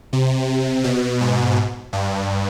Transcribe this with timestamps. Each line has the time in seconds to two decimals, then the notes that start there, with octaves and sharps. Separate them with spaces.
0.13 C3
0.84 B2
1.21 G#2
1.93 G2